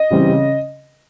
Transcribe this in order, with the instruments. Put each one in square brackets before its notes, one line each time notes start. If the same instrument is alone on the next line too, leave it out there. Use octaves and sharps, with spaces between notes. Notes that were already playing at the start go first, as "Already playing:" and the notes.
Already playing: [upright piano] D#5
C#3 E3 G3 C4
C#3